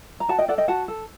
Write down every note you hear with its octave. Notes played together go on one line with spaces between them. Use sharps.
A#5
F#4 F#5 A5
D#5 G5
A4 D5 F#5
D#5 G5
F#4 F#5 A5
A4